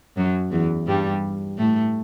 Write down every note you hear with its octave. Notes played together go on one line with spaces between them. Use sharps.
F#2 F#3
E2 E3
G2 G3
A2 A3